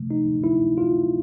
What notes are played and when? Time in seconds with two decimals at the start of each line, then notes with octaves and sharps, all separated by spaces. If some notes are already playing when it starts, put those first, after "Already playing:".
Already playing: C3 F3 A3
0.11 D#4
0.44 E4
0.78 F4